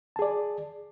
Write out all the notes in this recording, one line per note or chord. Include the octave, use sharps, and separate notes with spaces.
G#4 D5 A5